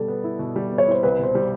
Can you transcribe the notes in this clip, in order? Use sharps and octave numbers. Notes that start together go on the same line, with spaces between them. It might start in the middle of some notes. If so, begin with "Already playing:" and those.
Already playing: B2 G3 A4
B3
E4
B2
G3
B3
C#5
E4 C5
C2 B4
B2 C5
G3